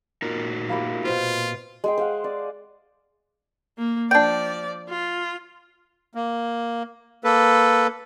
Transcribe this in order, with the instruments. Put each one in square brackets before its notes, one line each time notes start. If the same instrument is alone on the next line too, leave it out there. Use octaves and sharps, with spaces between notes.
[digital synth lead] A#2 [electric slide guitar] D#4 F#4 A#4
[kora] A#3 E4 G4
[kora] B2 C4 C5 [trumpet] F4
[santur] G#3 G#4 G5
C5 F5 F#5
D5
[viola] A#3
[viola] F3 D5 [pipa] D4 G5
[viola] F4
[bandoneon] A#3
A#3 A4 B4